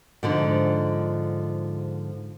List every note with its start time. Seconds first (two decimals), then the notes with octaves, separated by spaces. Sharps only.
0.23 G#2 D3 F3